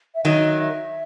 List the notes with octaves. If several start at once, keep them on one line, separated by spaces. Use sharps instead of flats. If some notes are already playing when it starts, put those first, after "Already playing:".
E5
D#3 F#3 D#5
E5